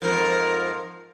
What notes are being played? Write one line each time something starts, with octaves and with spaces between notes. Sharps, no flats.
F2 G#2 F3 A#4